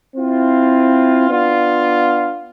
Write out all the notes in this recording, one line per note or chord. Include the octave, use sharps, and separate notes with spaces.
C4 E4 F4
B3 D4 F4